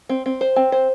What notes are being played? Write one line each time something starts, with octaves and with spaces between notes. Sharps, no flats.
C4
C4
C5
C4
C5